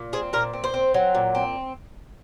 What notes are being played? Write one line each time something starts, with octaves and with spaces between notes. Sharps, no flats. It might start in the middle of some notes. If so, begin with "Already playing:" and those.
Already playing: A#2
C4 G#4
A#2 A#4
C4
C5
C4
F#3
A#2
C4